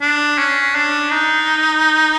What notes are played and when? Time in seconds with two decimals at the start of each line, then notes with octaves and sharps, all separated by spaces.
0.01 D4
0.38 C#4
0.75 D4
1.11 D#4